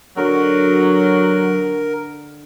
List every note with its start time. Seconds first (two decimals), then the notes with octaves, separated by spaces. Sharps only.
0.17 D3 F#3 A#4